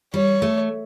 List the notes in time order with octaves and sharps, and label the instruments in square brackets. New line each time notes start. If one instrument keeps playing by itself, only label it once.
[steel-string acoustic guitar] G3 [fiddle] C#5
[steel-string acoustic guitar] A3